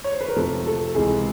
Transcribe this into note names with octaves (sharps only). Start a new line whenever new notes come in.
C#5
C5
B4
A#4
F2 C3 F3 A3 A4
A4
C#2 C3 E3 G#4